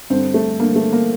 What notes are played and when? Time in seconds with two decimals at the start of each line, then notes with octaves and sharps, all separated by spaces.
0.10 G2 D3 C4
0.34 A3
0.60 G2 D3 A#3
0.76 A3
0.93 A#3